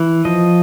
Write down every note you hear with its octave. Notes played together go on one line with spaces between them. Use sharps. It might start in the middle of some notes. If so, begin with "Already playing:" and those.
Already playing: E3
F3 D#5